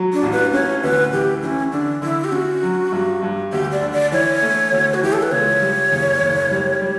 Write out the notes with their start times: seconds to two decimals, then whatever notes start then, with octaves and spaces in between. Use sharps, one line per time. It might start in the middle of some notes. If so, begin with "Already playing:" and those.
Already playing: F#3
0.13 D4
0.23 A1
0.32 B4
0.53 C#4 C#5
0.83 D2 B4
1.12 E3 G4
1.42 E3 C#4 D4
1.72 D3 D4
2.02 D3 E4
2.24 G4
2.32 C#4 F#4
2.63 F#3
2.92 G2
3.23 G2
3.52 D2 G4
3.72 D5
3.81 D3
3.93 D5
4.12 E3 C#5
4.42 A3
4.72 D2
4.94 F#4
5.02 E3 G4
5.13 A4
5.23 B4
5.32 C#2 C#5
5.62 G3
5.91 F#1
6.21 F#1
6.51 G3
6.82 G3